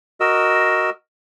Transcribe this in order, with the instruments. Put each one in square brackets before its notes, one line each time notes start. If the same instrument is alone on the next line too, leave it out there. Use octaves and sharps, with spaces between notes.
[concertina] F#4 A#4 D#5 E6